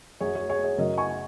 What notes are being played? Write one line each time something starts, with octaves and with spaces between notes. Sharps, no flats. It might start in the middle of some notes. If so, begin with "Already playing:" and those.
F#2 F#3 G#4 C#5
G#4 C#5
G#4 C#5
G#4 C#5
F#2 C#3 F#3 A#4 D#5
G#5 C#6